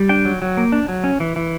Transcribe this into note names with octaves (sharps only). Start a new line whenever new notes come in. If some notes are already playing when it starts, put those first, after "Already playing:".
Already playing: G3
D4 G5
F#3
F#3
A#3
D4
F#3
C#4
E3
E3